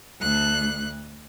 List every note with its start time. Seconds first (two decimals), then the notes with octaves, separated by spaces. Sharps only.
0.20 D2 F#6